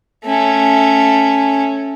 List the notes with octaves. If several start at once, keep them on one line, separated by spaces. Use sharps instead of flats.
A3 C#4